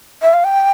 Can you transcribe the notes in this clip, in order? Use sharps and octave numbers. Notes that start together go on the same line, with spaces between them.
E5
F5
G5